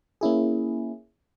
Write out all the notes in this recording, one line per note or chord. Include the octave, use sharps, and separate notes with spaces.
A#3 C#4 E4 G#4